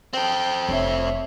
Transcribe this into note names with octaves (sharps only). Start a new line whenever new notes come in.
C4 A4 G5
F1 D4 C#5 E5